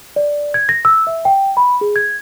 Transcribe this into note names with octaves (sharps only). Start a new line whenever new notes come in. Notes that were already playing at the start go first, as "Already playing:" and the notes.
D5
G#6
A#6
E6
E5
G5
B5
G#4
G#6